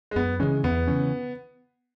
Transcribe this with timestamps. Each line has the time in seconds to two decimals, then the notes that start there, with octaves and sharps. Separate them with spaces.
0.11 G#3
0.16 F#2 B3
0.40 C#3 E3 G#3 C#4
0.63 E2 B3
0.87 C#3 E3 C#4